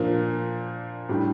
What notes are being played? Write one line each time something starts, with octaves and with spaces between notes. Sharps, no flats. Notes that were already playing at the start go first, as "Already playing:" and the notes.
Already playing: A#2 F3 A#3 D4
A2 G3 D4